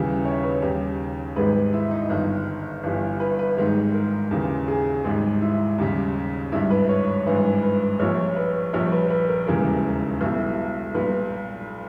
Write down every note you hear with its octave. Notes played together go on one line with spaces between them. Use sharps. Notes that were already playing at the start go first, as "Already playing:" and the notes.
Already playing: D#2 C#3 E3 G3
C#5
B4
D#2 C#3 G3
G#1 G#2 D#3 G3 B4
E4
D#4
G1 G2 D#3
G1 G2 E3 G3
B4
B4
G#1 G#2 D#3 G3
A#4
D#2 C#3 E3
G#4
G#1 G#2 G3
E4
D#2 C#3 G3
G#1 G2 G3 E4
B4
C#5
G#1 G2 E3 B4
B4
A#1 A#2 G3 C#5
B4
A#1 A#2 G3 C#5
B4
B4
A#4
E1 D#2 C#3 E3 G3 A#4
B1 B2 G3 E4
B1 A#2 G3 B4